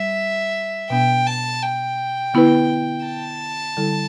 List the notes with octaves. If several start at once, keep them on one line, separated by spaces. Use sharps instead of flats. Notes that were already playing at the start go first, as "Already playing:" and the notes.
Already playing: G3 E5
B2 B3 D4 G5
A5
G5
D3 B3 E4 B4
A5
D3 G3 E4 A4